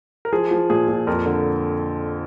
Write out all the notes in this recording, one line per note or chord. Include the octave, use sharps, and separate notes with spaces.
A#4
F3 G#4
F3
A#2 G#4
A#2
F2 A#4
D3